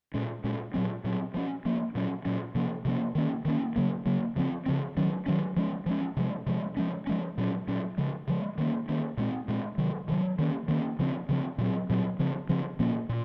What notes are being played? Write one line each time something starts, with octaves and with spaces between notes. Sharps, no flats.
A#2 G#3 C#4
A#2 G#3 C#4
A#2 F#3 C4
A#2 F#3 C4
F3 A#3 C#4
F3 A#3 C#4
A#2 F#3 C#4
A#2 F#3 C#4
C3 F3 A#3 C#4
C3 F3 A#3 C#4
D#3 A#3 C#4
D#3 A#3 C#4
C#3 F#3 A#3
C#3 F#3 A#3
C#3 F3 C4
C#3 F3 C4
D#3 F#3 C#4
D#3 F#3 C#4
F3 G#3 C#4
F3 G#3 C#4
C3 F3 G#3
C3 F3 G#3
F3 G#3 C#4
F3 G#3 C#4
A#2 F#3 C#4
A#2 F#3 C#4
C#3 F3 G#3
C#3 F3 G#3
D#3 A#3 C#4
D#3 A#3 C#4
A#2 G#3 C4
A#2 G#3 C4
C3 D#3 F#3
C3 D#3 F#3
D#3 A#3 C#4
D#3 A#3 C#4
C#3 F3 C4
C#3 F3 C4
A#2 F#3 C4
A#2 F#3 C4
C#3 F3 C4
C#3 F3 C4
A#2 F3 A#3 C#4
A#2